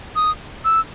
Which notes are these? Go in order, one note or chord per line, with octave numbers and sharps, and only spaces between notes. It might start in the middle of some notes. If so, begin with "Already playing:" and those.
D#6
E6